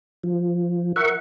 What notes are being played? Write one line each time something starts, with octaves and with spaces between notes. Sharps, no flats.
F3
A#4 E5 F#5 C#6